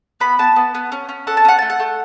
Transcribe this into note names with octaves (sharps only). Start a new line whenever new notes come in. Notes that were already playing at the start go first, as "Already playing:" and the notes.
B3 B5
B3 A5
B3
B3
C#4
C#4
A4 F#5
A5
C#4 F#5
A3 A5
F#5
A3